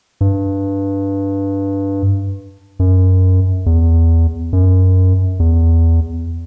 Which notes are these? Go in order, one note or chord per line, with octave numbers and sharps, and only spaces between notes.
G2
F#2
E2
F#2
E2